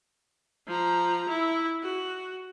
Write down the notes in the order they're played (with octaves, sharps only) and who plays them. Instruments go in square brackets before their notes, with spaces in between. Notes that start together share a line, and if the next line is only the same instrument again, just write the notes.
[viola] F3 A#5
E4
F#4